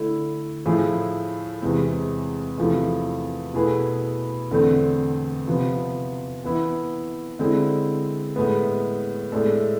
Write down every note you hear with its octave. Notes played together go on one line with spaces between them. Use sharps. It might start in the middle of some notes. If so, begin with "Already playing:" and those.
Already playing: D3 A3 E4
A2 F3 A3 E4 G#4
E2 C3 E3 G#3 C4
E2 C3 F3 A3 E4
B2 A3 E4 G#4 B4
E2 D3 A3 C4
C3 F3 B3
E3 B3 E4
D3 G#3 C4 E4
A2 G#3 B3
A2 G#3 D4 A4